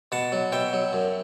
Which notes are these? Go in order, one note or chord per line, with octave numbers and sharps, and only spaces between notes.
B2 F#5 A5
F#3
B2 E5 G5
F#3
F#2